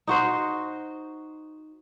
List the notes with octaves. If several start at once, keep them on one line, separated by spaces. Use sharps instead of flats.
D#4 F#4 C5